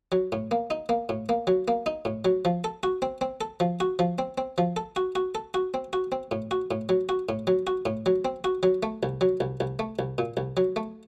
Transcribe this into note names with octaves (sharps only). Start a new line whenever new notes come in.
F#3
A2
A#3
D#4
A#3
A2
A#3
F#3
A#3
D#4
A2
F#3
F3
A4
F#4
C4
C4
A4
F3
F#4
F3
C4
C4
F3
A4
F#4
F#4
A4
F#4
C4
F#4
C4
A2
F#4
A2
F#3
F#4
A2
F#3
F#4
A2
F#3
C4
F#4
F#3
A3
C2
F#3
C2
C2
A3
C2
A#2
C2
F#3
A3